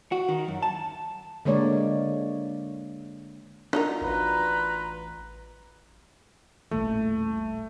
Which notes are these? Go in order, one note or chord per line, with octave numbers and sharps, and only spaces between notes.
F#4
D#3
F#2
A5
D3 G#3 A#3 C#5 D5
F#3 D4 D#4 F4 F#4 A#4
A1 B4 A#5 C6
D#1 A1 A3